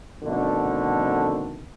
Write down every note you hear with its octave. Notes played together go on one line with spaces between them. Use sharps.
F2 B2 D3 D#3 A3